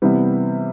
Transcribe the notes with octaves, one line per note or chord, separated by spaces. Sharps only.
C3 E3 G3 B3